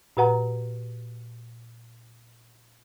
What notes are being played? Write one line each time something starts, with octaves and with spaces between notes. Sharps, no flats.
A#2 F#4 B4 F#5 A#5